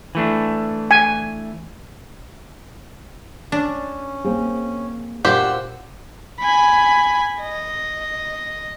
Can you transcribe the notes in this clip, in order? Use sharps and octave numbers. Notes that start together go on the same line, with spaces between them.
E3 A3 D4
G#5
C#4 D4
A#3 C4 G#4
A#2 D4 F#4 G4 C5 F#5 E6
G#5 B5
D#5